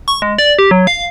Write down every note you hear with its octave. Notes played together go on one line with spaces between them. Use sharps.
C#6
G#3
D5
G4
F#3
F5